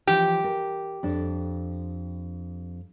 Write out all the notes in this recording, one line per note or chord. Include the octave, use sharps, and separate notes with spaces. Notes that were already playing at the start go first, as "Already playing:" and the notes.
E3 F3 G4
A#4
F2 D4